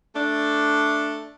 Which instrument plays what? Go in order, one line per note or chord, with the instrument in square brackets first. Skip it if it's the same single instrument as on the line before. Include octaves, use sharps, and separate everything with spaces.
[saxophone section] A3 D4